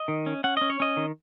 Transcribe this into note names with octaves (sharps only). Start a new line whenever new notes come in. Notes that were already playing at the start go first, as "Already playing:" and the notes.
Already playing: D#5
D#3
C#4
C#4 F#5
C#4 D#5
C#5
C#4 D#5
D#3